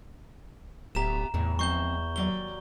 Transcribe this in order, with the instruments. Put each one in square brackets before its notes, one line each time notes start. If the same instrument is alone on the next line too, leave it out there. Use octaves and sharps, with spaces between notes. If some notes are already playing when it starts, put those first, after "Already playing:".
[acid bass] D1 [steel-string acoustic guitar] B3 G4 E5 [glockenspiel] A#5 E7
[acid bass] E2 [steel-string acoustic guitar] A2 C3
[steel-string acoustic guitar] F3 G#3 C4 [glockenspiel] C#6 G6 G7
[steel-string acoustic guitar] D#2 F#3 D5 [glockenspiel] G7